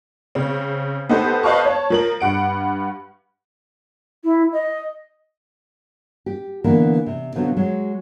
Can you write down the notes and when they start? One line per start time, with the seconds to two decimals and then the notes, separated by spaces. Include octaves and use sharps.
0.35 C#3 C4
1.09 B3 D#4 G4 A4 C5
1.43 B4 C5 D#5 F5 A5 C#6
1.65 C#5 A5
1.90 F3 A#4 F#7
2.20 G2 F#5 D7
4.24 E4
4.52 D#5
6.26 G4
6.64 D3 E3 A#3 B3 A#4
7.06 C3
7.35 B2 D3 F3 F#3 B3 C4
7.57 F#3 G#3